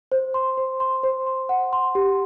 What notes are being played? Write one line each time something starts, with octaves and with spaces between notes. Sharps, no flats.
C5
C6
C5
C6
C5
C6
F#5
C6
G4